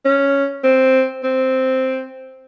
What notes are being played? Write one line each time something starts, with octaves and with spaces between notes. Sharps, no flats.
C#4
C4
C4